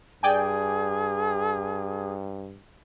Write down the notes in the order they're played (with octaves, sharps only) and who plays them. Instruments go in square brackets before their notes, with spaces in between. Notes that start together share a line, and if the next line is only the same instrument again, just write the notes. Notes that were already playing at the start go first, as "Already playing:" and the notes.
[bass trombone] G2 [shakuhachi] G#4 [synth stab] D5 G5 G#5